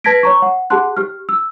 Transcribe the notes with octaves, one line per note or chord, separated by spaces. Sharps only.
B4 A5 G#6 A#6 B6 D7
C#5 A#5 C#6
F#5
G4 G#4 F#5 A5 C6 F#6
G4 F6
E6